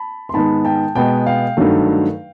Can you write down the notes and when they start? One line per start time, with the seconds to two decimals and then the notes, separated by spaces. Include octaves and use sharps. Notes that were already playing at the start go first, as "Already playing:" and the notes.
Already playing: A5 B5
0.29 C6
0.34 G#2 D#3 G#3 B3 A5 B5
0.65 G5 A5
0.95 B2 G#3 B3 G5 A5
1.27 F5 G5
1.57 G2 D#3 F#3 A3